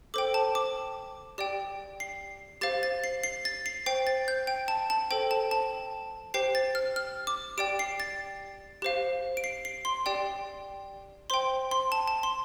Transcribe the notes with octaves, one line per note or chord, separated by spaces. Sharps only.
A4 C5 G5 D6
A5
D6
G4 D5 G5
C7
G4 C5 F5 A6
A6
C7
C7
A6
C7
C5 G5 C7
A6
G6
G5
A5
A5
A4 C5 G5
A5
A5
G4 C5 G5 C7
A6
F6
F6
D6
G4 D5 G5 D7
C7
A6
G4 C5 F5
D7
C7
C7
C6
G4 D5 G5
C5 G5 C6
C6
A5
A5
C6